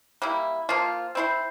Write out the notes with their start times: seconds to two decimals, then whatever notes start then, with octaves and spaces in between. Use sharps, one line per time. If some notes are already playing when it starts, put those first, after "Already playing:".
0.22 G3 A#3 E4
0.69 F3 A#3 F4
1.15 C4 E4 G#4 C5